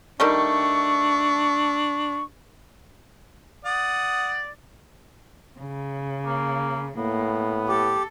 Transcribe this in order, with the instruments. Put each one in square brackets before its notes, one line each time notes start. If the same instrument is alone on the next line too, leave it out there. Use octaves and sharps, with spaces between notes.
[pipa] D#3 G3 A3 [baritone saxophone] D4 [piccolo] C#6
[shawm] D5 [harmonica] F#5 D#6
[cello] C#3
[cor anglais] A#3
[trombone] A2 [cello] A#3 [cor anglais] B3
[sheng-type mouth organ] G4 [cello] A4